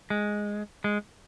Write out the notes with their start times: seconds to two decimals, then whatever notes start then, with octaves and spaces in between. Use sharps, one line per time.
0.10 G#3
0.84 G#3